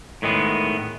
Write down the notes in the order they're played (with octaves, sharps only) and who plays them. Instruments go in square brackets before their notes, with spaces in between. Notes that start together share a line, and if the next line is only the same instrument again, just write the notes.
[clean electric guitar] A2 D#3 G#3 B3